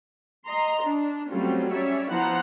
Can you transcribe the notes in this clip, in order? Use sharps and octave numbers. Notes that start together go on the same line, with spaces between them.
D#5 A#5 C6
D4
F#3 G3 A3 C4 C#4 F4
G3 C#4 C#5 D5 E5
F3 B3 E4 C5 F#5 A#5